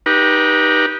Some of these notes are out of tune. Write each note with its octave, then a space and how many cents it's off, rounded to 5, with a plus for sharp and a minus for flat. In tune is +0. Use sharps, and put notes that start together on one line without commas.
D#4 +0 G4 +0 B4 -30